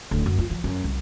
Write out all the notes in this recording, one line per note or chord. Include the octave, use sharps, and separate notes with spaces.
D1
F#2
F4
F3
F#2
C2